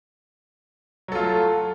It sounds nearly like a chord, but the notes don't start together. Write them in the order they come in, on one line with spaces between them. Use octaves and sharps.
F#3 A4 F4 A3